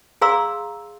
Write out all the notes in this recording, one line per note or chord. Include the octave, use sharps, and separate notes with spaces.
G#4 D5 F5 A#5 C6 E6